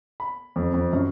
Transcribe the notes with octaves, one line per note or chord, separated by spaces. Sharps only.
B5
F2
F2
F#2